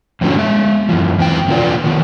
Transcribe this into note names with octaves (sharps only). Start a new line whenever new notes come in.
F2 A2 D3 F#3 C#4
G#3 E5
F#2 E3 F3
E2 C4 G5
E2 B2 D3 G#3 F4 D5
D#3 F3 B3